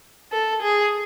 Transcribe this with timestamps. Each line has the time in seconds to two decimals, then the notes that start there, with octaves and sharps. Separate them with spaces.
0.32 A4
0.62 G#4